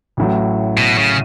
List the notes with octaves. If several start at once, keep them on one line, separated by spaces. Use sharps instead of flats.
A1 A2 F#3
B2
C#3